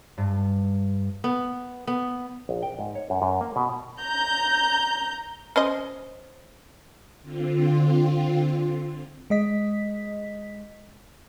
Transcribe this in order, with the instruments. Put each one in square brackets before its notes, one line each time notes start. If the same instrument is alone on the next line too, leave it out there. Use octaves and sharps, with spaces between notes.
[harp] G2
[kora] B3
B3
[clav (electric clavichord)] A#1
G5
G#2
C#5
F#2
F#2
A#3
B2
[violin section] A#5 G6
[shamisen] C#4 C5 D#5
[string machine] D3 C4 F4
[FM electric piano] G#3 D#5 B6